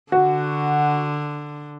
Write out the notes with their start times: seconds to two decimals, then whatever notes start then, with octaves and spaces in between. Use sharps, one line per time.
0.12 D3 F#4